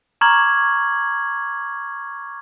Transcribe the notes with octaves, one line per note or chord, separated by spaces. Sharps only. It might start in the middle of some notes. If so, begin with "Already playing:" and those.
A#5 C#6 D6 F6 G#6 F#7